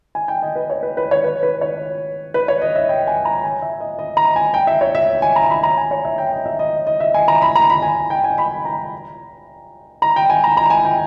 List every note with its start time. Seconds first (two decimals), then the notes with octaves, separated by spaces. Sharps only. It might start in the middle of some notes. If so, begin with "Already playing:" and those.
0.15 G#5
0.28 G5
0.42 D#5
0.55 B4
0.70 C#5
0.83 B4
0.97 B4
1.11 C#5
1.24 B4
1.43 B4
1.61 C#5
2.34 B4
2.48 C#5
2.62 D#5
2.75 E5
2.89 G5
3.07 G#5
3.25 A#5
3.44 G#5
3.62 E5
3.80 D#5
3.99 D#5
4.17 A#5
4.36 G#5
4.54 G5
4.67 E5
4.81 C#5
4.95 E5
5.22 G#5
5.36 A#5
5.50 B5
5.63 A#5
5.77 G#5
5.91 C#5
6.05 E5
6.18 G5
6.32 D#5
6.46 E5
6.59 D#5
6.87 D#5
7.00 E5
7.14 G#5
7.28 A#5
7.42 B5
7.55 A#5
7.70 B5
7.82 G#5
8.10 G5
8.24 G#5
8.38 B5
8.65 A#5
10.02 A#5
10.16 G5
10.30 G#5
10.44 A#5
10.57 A#5
10.70 G#5
10.85 G5